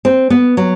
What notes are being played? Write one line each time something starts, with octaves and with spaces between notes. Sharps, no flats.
C4
B3
F#3